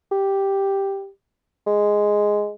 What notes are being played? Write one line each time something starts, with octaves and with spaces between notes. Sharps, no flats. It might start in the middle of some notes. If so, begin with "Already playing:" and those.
G4
G#3